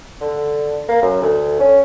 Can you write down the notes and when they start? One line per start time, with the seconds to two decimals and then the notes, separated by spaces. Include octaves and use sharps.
0.21 D3
0.88 A#3
1.02 F#2
1.22 D2
1.60 C#4